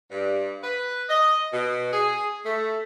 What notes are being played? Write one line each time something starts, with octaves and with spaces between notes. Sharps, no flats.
G2
B4
D#5
B2
G#4
A3